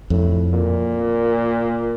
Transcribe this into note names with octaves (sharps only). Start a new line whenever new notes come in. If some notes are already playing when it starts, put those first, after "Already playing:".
F2 A2
A#2